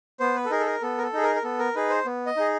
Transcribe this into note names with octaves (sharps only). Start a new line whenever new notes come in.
B3 C5
B4
A4
D#4 G#4 A#4
A4
A#4
B3 A4
A#4
A4
D#4 G#4
A#4
A#4
B3 A4
A#4
D#4 G#4 B4
C5
B3
D#5
D#4 G#4